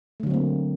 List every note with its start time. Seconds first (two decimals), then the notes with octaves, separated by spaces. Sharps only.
0.20 A3
0.23 D3
0.27 F#3
0.30 C4
0.34 A#3